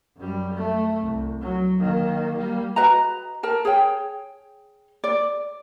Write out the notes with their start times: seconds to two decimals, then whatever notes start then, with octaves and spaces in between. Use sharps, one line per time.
0.16 F#2 G3
0.54 A3
1.01 C2
1.41 F#3
1.79 D#3 A#3
2.36 G3 A#3
2.76 F#4 B4 D#5 A#5
3.43 A#4 A5
3.65 G#4 C#5 G5
5.04 D5